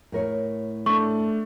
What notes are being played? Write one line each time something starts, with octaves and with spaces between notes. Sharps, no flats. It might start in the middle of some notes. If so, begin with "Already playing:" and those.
A2 A#4 C#5
A3 D4 C#6